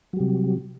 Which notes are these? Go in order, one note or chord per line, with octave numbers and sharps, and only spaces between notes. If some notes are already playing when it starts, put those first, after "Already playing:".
C3 F#3 G3